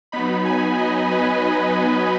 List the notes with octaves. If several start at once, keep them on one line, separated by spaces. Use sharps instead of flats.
F#3 B3 D#4 B5
G#5
D#5
B4